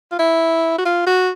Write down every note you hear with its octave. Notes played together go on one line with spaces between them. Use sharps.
F4
E4
F#4
F4
F#4